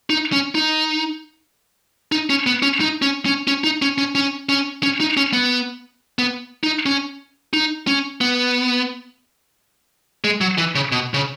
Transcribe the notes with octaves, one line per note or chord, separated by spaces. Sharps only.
D#4
C#4
D#4
D#4
C#4
B3
C#4
D#4
C#4
C#4
C#4
D#4
C#4
C#4
C#4
C#4
C#4
D#4
C#4
B3
B3
D#4
C#4
D#4
C#4
B3
G#3
F#3
E3
C#3
B2
C#3